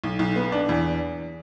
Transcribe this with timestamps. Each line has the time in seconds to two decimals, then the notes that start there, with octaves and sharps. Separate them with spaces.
0.04 B1
0.19 B1
0.36 B3
0.52 D4
0.69 E2